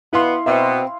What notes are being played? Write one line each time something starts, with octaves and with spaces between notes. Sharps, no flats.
B2 B3 E4 F5 C6
B2 C4 E5